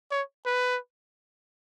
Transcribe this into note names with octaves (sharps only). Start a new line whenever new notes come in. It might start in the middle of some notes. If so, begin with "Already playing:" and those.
C#5
B4